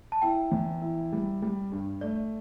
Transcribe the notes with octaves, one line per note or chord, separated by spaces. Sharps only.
A5
E4 G5
E2
E4
G3
G3
G2
A3 D5